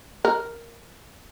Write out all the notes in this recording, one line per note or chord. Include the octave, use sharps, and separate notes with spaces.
A#4